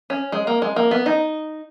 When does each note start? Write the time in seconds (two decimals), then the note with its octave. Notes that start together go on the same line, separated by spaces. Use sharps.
0.10 C#4
0.32 G#3
0.47 A#3
0.62 G#3
0.76 A#3
0.91 B3
1.06 D#4